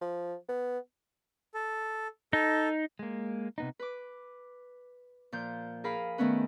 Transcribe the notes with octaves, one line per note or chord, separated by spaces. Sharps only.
F3
B3
A4
D#4 A4
G#3 A#3
C3 B3 D#4
B4 D6
A#2 F3 G6
G#4 A#4 F5 B5
D#3 A3 B3 C#4 B4